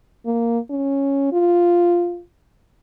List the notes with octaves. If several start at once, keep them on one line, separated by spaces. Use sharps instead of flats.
A#3
C#4
F4